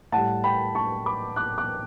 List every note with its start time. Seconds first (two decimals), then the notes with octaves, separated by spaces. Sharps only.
0.12 A2 G3 F#5 A5
0.44 G5 B5
0.75 A5 C#6
1.06 B5 D6
1.36 D6 F#6
1.58 D6 F#6